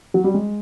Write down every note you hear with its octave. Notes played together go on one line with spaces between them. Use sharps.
F#3
G3
G#3